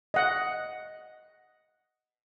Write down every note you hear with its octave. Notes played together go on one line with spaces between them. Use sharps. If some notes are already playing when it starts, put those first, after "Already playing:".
D#5 F#5